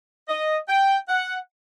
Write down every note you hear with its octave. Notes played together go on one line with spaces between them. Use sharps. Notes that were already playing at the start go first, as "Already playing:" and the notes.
D#5
G5
F#5